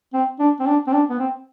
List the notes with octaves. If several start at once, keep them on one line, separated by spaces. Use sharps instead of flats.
C4
D4
C4
D4
C4
D4
B3
C4